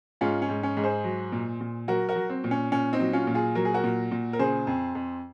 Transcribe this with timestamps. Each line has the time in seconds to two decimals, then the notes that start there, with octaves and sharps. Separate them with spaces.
0.21 G#2 C#4 F4
0.42 C#4
0.49 G#2
0.63 C#4
0.77 G#2
0.84 G#4 C5
1.04 F#3
1.32 A#2
1.61 A#2
1.88 F#3 F#4 A#4
2.09 F#4 A#4
2.16 F#3
2.30 C4
2.44 A#2
2.51 C#4
2.72 A#2 C#4
2.93 C4 D#4
3.00 F#3
3.13 C#4 F4
3.27 A#2
3.34 F4 G#4
3.55 F#3 A#4
3.65 G#4
3.74 F#4 A#4
3.84 A#2
4.11 A#2
4.33 A#4
4.39 C#3 G#4 C5
4.67 F2
4.95 F2